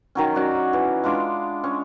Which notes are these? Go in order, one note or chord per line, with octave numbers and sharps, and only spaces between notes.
D#3 F#3 C#4
C#4 F#4 D5
E3
G#3 D4 F4 D6
C#4